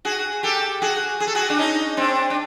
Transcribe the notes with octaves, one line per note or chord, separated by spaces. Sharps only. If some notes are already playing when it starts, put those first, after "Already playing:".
F#4 G#4
G4 A4
F#4 G#4
G#4
A4
F#4 G#4
D4
C#4 D#4
C4 D4
D4